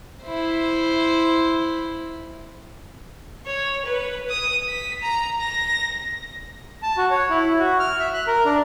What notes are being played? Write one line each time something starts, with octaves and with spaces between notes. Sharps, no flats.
E4 C5
C#5
B4
D#6
B6
A#5
A#6
A5
F#4
C#5
E4
F#4
F6
E5
F#6
A#4
D4